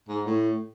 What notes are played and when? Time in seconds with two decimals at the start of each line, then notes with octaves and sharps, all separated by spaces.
0.09 G#2
0.26 A2